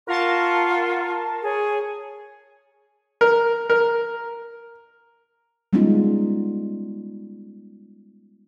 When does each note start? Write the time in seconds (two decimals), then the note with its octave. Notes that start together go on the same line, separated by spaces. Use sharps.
0.07 F4 A#4 F#5 A5 C#6
1.45 G#4 C#5
3.21 A#4
3.70 A#4
5.73 G3 G#3 B3 C#4 D#4 F4